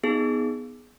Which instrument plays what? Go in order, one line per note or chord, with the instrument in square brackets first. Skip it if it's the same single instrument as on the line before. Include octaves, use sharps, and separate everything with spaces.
[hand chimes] B3 D#4 G#4